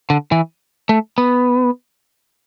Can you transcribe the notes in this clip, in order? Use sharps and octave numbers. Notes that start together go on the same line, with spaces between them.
D3
E3
A3
B3